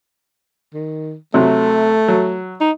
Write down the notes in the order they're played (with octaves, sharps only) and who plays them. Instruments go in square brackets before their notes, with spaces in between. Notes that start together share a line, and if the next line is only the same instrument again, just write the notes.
[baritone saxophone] D#3
[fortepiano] C3 F#3 [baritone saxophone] A3
[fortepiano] F#3
[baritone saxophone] D#4